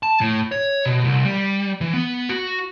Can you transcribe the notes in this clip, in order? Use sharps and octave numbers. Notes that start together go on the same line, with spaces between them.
A5
A2
C#5
B2
C2
G3
E3
B3
F#4